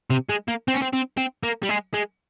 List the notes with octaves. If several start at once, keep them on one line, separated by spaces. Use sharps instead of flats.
C3
G#3
A#3
C4
C#4
C4
C4
C4
A#3
G3
G#3
G#3